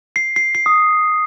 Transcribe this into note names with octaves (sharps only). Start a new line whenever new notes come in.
C7
C7
C7
D#6